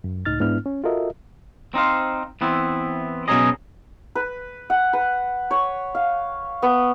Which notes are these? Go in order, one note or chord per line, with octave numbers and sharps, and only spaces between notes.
F#2
C#2 A2 D#4 F6 A6
G#2 B3 D4 E4 F6
C#4
F4 F#4 A4 A#4 D#5 E5
C4 D#4 C5 F5
E3 B3 C4 E4
B2 F#3 C#4 D#4 G#4 D#5
B4
F#5
B4
C#5
F5
B3